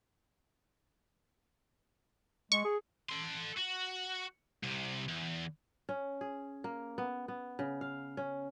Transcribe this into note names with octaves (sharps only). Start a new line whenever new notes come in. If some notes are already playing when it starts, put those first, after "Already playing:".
G#3 C#6
G#4
A4 C6
F#4
C2 C3
E2
C#4
G#4
A#3
B3
B3
C#3
F5
C#4